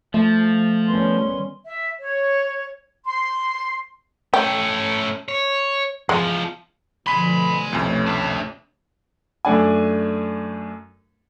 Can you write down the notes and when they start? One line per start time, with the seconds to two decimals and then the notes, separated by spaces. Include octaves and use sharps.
0.14 F3 A3
0.87 D#3 G3 B3 C#4 C6
1.64 E5
2.00 C#5
3.04 C6
4.34 A3 C#4 G5
5.28 C#5
6.09 E2 F3 G#3
7.07 B2 D3 F3 G#5 B5 C6 B6
7.72 C2 F2 B2 A3 C#4
8.07 D4 E5
9.45 F#2 A3 D4 G#5